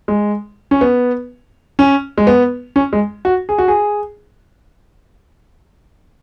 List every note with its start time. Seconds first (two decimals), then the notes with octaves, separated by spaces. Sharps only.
0.08 G#3
0.71 C#4
0.81 B3
1.79 C#4
2.18 G#3
2.27 B3
2.76 C#4
2.93 G#3
3.25 F#4
3.49 G#4
3.58 F#4
3.68 G#4